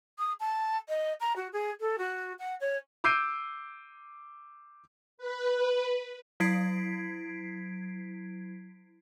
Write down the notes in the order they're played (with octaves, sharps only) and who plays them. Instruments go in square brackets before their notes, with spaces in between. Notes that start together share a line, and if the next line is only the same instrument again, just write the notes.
[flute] D#6
A5
D#5
A#5
F#4
G#4
A4
F#4
F#5
C#5
[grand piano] D6 E6 G6 C7 D7 D#7
[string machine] B4
[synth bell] F#3 E4 G#6 B6 C7 D7